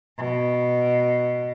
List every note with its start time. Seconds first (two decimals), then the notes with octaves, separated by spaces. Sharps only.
0.18 B2